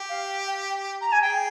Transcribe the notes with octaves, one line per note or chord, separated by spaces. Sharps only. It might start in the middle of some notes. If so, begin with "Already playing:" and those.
Already playing: G4
F5
G5
A#5
G#5
G#4 G5